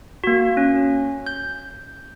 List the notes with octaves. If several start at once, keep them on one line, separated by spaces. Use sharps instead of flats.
A#3 F#4
C#4
G6